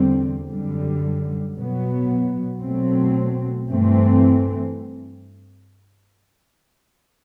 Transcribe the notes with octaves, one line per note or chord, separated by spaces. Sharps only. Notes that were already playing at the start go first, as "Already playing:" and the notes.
Already playing: E2 D3 G3 C4
F#2 D3 G3
B2 F#3 B3
B2 F#3 A3 C4
G2 E3 A3 C4